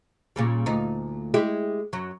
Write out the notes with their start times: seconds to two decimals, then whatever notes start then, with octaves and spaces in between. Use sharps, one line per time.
0.36 A#2 C#3 G3
0.66 D2 A#2 D#4
1.34 G#3 E4 G4
1.93 F#2 F#3